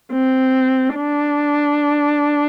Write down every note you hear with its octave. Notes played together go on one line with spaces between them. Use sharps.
C4
D4